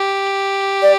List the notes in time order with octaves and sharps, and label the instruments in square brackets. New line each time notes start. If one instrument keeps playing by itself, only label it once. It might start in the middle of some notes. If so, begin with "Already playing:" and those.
Already playing: [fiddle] G4
[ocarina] D5